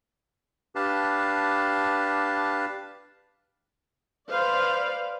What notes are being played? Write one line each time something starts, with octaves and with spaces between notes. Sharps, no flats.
D4 G4 B4 F5 A5
B4 C5 D5 F5